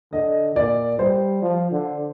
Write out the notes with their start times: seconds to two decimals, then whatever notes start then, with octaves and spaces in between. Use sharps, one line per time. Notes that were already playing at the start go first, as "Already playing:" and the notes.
0.13 D3 D#5
0.56 A#2 D5
0.99 G3 C5
1.43 F3
1.72 D3